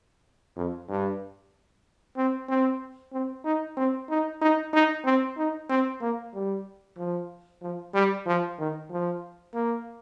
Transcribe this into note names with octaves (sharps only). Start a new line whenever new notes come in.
F2
G2
C4
C4
C4
D#4
C4
D#4
D#4
D#4
C4
D#4
C4
A#3
G3
F3
F3
G3
F3
D#3
F3
A#3